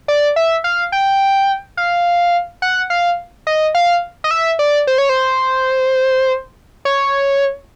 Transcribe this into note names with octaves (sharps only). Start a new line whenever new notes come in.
D5
E5
F5
G5
F5
F#5
F5
D#5
F5
D#5
E5
D5
C5
C#5
C5
C#5